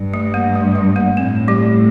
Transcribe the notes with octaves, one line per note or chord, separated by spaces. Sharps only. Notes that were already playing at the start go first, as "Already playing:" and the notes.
Already playing: G2
A3
A#3
A3
A3
A#3
A2 C4
G3 G4